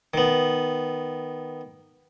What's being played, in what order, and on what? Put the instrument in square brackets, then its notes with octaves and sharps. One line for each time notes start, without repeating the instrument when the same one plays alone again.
[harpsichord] D#3 B3